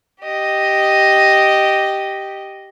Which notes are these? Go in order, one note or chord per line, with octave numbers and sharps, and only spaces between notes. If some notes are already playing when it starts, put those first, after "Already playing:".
G4 D#5